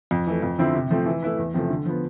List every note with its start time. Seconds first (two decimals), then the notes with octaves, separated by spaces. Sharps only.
0.11 F2
0.27 E3 A3
0.42 F2
0.59 D3 F3 C4 E4
0.74 C3
0.90 F3 A3 C4
1.06 E3
1.22 A3 E4 B4
1.38 E2
1.54 C3 F3 A3
1.70 D3
1.86 F3 B3